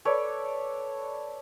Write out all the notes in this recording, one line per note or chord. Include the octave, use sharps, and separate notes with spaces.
A4 B4 C#5 D5